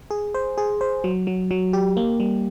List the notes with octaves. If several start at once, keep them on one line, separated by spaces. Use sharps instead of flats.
G#4
C5
G#4
C5
F#3
F#3
F#3
G4
A#3
G3